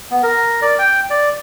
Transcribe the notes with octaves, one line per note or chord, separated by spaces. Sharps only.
B3
A#4
D5
G5
D5